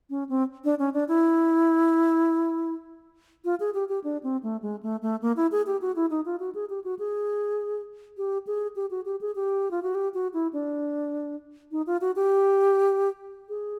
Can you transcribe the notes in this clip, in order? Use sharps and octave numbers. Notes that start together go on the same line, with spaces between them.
C#4
C4
D4
C#4
D4
E4
F4
G#4
G4
G4
D4
C4
A3
G#3
A3
A3
A#3
E4
G#4
G4
F#4
E4
D#4
F4
F#4
G#4
G4
F#4
G#4
G4
G#4
G4
F#4
G4
G#4
G4
F4
F#4
G4
F#4
E4
D4
D#4
F4
F#4
G4
G#4